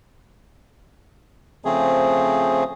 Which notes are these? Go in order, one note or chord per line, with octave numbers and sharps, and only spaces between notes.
C#3 F3 A3 C4 G#4